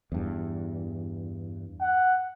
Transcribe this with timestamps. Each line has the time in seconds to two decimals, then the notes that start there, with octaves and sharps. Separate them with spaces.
0.12 E2 G2
1.82 F#5